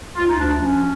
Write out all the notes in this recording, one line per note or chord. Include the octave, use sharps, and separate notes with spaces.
D2 F4
D#4
D2 D4
F3 C#4